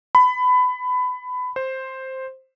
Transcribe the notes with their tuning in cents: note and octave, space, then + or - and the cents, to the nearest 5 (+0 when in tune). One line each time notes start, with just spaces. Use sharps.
B5 +20
C5 +5